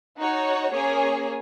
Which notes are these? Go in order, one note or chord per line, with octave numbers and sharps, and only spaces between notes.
D#4 F#4 C#5 F#5
A#3 C#4 G#4 C#5 G#5